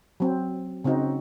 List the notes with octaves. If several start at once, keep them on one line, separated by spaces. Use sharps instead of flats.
F#3 C4
C#3 C4 C#4 D#4 F#4